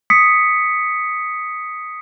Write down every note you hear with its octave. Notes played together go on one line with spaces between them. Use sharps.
D#6 B6 C#7